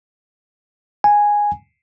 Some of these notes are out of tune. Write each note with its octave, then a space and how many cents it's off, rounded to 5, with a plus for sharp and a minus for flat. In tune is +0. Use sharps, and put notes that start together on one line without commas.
G#5 -5